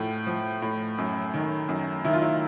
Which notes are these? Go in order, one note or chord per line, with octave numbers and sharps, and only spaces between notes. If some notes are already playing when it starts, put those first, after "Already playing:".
Already playing: A2 F3
F3
A2
F#2
D#3
F#2
D#3 E4
F4
E4